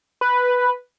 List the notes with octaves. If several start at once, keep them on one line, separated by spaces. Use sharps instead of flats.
B4